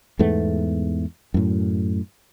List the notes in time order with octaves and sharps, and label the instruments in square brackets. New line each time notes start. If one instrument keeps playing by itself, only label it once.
[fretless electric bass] E2 G#2 A3 B3
F#2 A2